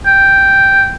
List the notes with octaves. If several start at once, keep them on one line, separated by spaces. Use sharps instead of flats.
G5